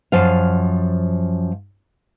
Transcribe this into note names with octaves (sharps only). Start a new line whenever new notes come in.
F#2 F3 F5